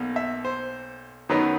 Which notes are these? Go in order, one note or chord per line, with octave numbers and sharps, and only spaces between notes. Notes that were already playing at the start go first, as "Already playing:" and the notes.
Already playing: B1 B2 A#3
E5
C5
F#2 D#3 F#3 B3 D#4 B4